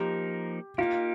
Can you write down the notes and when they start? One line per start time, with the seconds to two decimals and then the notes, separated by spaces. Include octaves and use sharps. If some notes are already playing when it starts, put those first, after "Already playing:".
Already playing: F3 A#3 D#4 G4 A#4
0.78 A#3 D#4 F4 G4